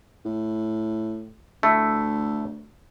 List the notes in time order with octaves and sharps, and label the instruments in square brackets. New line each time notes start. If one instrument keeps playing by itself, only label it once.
[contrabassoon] A2
[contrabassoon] D2 [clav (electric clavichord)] A3 E4